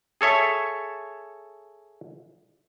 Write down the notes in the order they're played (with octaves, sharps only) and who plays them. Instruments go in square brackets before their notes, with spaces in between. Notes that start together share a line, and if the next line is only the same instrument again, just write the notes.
[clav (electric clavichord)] G#4 A4 C#5 E5